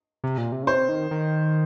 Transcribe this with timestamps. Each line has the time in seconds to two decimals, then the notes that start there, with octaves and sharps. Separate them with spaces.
0.24 C3
0.38 A#2
0.52 C3
0.63 C#3
0.67 C3 C5
0.89 D#3
1.11 D#3